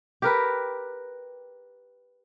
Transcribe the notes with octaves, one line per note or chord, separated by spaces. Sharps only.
G4 A#4 B4